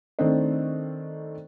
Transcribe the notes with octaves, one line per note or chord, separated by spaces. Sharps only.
D#3 A3 C4 D4 C5 D#5